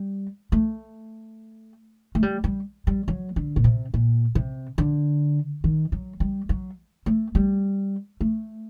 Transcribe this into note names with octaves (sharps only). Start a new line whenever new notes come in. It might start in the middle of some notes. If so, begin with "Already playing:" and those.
Already playing: G3
A3
A3
G3
G3
G3
F#3
D3
A#2
C3
A#2
C3
D3
D#3
F#3
G3
F#3
A3
G3
A3